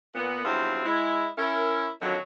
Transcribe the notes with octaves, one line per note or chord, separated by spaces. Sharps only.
A#2 B3
E2 G2 F#3 C4 F4 E5
G#3 E4
C#4 E4 A#4
F2 D3 D#3 F#3